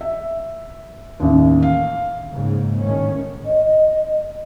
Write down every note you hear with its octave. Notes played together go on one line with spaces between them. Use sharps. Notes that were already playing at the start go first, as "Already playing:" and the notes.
E5
A1 D#2
F5
G#2 C#3 A#3
A2 D#3 C#4
D#5